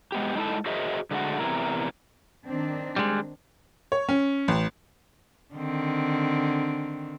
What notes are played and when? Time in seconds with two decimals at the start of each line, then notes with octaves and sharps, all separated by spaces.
0.12 G#3 B3 G4
0.36 G#3 D#4 E4 A4 A5
0.66 F#4 G#4 A#4 C5 D#5 E5
1.11 D3 G#3 A3 F#4
1.39 E2 C3 E4 A#4
2.45 D#3 C4 D4
2.96 G3 G#3
3.92 C#5
4.09 C#4
4.48 A1
5.54 D3 D#3 C4